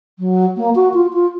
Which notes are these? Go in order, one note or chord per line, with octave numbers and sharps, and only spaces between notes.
F#3
A#3
F#4
F4
F4